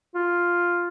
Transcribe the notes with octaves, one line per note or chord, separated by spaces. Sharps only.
F4